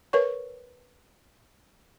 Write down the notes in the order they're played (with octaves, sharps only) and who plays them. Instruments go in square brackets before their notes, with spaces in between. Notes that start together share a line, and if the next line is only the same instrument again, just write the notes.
[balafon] A#4 B4 C#5 C#6